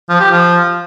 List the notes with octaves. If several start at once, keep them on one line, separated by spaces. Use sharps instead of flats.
F3
G4
F3